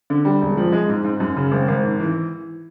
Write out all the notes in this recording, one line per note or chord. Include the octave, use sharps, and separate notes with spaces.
D3
G3
E1
F3
G#3
G#2
G#2
F#2
C#3
G#1
G#1
G#2
E3